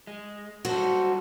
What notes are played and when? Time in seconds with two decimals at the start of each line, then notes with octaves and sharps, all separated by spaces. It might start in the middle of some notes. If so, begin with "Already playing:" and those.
0.07 G#3
0.65 F#3 G3 F#4 A4 C5